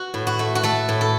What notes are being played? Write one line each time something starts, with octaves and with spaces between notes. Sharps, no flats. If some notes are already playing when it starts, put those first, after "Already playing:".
Already playing: F#4
A2
F#4
A3
F#4
A3 A4
A2
A4